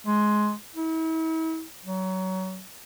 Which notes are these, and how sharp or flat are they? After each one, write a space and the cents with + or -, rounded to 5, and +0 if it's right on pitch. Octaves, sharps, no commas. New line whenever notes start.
G#3 +15
E4 -40
F#3 +25